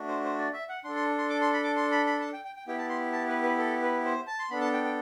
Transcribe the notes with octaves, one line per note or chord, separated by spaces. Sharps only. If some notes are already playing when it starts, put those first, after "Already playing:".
Already playing: A3 D4 F#4
C5
C5
D5
E5
F#5
D4 A4 C6
C6
C6
D6
C6
B5
D6
C6
B5
B5
A5
G5
G5
G5
B3 E4 G4 G5
A5
C6
A5
B4
B4
A4
B4
C5
A5
C6
B3 D4 A4 B5
A5
G5
G5